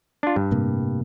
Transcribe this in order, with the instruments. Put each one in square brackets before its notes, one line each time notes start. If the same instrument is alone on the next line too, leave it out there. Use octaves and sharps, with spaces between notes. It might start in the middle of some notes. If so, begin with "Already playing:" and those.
[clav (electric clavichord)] D4 F4
G2
[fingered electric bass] A2 C3 A#3